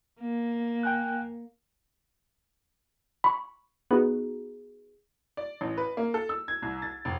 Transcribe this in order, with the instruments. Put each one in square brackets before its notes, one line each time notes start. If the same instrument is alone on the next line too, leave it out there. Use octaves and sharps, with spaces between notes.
[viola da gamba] A#3
[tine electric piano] G5 G#5 F#6
[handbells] B5 C#6
[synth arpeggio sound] B3 D#4 F#4 [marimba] G#4
[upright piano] D5
A1
B4
A#3
A4
E6
G#6
C2
A6
F1